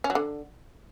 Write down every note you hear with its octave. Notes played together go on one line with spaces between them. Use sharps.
C#4
F#3
D3